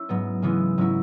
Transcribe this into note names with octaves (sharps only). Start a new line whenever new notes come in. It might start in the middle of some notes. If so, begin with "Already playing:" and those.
Already playing: C#4 E4
G#2 F#3 B3
C#3 E3 G#3 B3 E4
G#2 F#3 C#4 E4